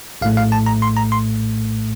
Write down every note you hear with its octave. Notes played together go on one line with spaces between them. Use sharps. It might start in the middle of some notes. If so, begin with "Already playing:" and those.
A#1 A2 A3 F5
F5
A5
A#5
C6
A#5
C6